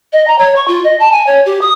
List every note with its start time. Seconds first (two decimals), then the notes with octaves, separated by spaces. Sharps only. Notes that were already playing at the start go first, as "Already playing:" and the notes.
0.13 D#5
0.27 A#5
0.38 C#5
0.55 C#6
0.67 F4
0.84 D#5
0.99 A5
1.12 G#5
1.26 C#5
1.45 G4
1.61 D#6